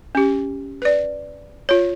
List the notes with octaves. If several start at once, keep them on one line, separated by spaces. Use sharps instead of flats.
C#4 G4
B4 D5
F4 C#5